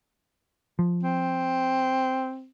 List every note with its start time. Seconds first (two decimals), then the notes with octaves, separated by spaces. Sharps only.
0.79 F3
1.03 C4